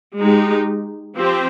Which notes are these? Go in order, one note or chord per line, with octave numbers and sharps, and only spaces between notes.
G#3 D#4 G4
F3 C4 G4 C5